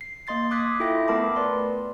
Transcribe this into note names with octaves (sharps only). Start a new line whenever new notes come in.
C7
A#3 D#5 C6 A6 C7
C6 D6 D#6 F#6 G#6 B6
E4 F4 A4 E5 G5 A#6
A3 B3 A#4 A5 B5 D6
B4 D5 C6